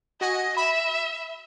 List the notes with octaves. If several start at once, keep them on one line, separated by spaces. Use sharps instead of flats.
F#4 D#5 G#5
E5 B5